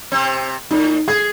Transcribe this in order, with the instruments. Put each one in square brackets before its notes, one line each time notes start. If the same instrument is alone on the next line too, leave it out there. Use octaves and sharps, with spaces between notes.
[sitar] C3 C4
[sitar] A2 [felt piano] D#4
[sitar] G#4 [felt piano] G#6